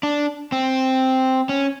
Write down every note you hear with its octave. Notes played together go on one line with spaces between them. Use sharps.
D4
C4
C#4